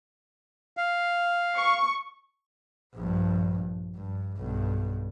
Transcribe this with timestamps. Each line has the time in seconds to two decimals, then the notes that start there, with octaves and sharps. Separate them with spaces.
0.77 F5
1.57 C#6
2.95 A#1 G2
3.96 G2
4.38 B1 G2